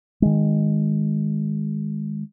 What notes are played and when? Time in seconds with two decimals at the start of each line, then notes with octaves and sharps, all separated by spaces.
0.22 D#3 G#3